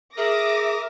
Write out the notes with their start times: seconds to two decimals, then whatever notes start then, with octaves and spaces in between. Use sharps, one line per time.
0.17 G#4 A#4 E5 D6 D#6 A#6